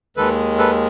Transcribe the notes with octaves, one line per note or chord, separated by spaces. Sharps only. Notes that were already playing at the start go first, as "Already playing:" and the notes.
D#2 D#3 G#3 A4 B4
A4 B4